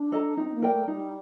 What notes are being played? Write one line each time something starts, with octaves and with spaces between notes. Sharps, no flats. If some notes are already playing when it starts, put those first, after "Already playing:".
Already playing: D4
A4 D#5 A#5
C4 D#4
C4
A#3
A#4 D5 G5
A3
G3 D#4